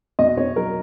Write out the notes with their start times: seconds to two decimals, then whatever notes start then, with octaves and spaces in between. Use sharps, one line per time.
0.19 B2 D#5
0.37 B2 C#5
0.56 F#3 A#4